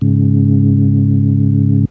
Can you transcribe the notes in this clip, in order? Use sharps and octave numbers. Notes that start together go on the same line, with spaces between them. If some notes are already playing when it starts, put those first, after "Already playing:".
G#2 C#3